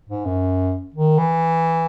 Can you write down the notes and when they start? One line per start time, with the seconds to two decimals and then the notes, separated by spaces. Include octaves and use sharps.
0.09 G#2
0.25 F#2
0.94 D#3
1.18 E3